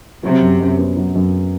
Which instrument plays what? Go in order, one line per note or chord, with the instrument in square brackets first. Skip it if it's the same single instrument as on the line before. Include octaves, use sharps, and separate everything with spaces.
[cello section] C3 [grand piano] F#3
[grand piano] F#2
F#2
B3
F#3
F#2